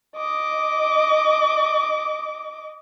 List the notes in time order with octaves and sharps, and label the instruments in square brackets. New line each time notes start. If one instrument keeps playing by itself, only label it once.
[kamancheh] D#5 D6